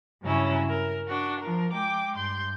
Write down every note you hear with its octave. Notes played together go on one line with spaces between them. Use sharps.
G2 C#3 F#3 C#4 E4
A#4
D4 F#4
F3 A#4
G#3 G5 D6
G2 C6 G6